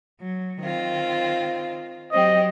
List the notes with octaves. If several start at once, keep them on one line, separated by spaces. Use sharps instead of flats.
F#3
D#3 C4 F4
F#3 C4 G4 D#5